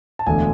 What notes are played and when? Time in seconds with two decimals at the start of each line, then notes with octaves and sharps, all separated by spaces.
0.19 A5
0.26 E1 D2 D3 G#5